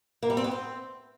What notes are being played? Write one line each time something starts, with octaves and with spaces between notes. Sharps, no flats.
A#3
G3
C4
B3
C4